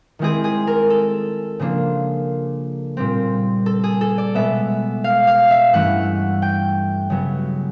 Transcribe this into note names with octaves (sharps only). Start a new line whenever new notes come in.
D#3 G#3 C4 E4 G#4
G#4
A#4
A4
C#3 F3 A#3 D4
A#2 G3 C4
A4
G#4
A4
D5
B2 G#3 B3 E5
F5
F5
E5
G2 E3 A3 C#4 E4 F#5
G5
C#3 F#3 B3